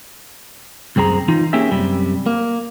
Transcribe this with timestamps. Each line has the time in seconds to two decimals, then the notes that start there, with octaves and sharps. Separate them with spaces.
0.96 C2 F#2 C4 G#4 A#5
1.28 E3 D#4 F4
1.53 A#3 C#4 G4 G#4 E5
1.71 F#2 C3 G3
2.26 A#3